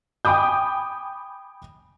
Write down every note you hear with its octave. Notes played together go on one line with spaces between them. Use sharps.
G5 G#5 B5 D6 D#6 G6